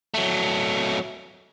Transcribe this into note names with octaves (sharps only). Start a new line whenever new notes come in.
F#3 A3